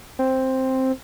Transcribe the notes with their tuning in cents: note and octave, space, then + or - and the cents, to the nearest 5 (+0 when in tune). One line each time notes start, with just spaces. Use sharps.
C4 +5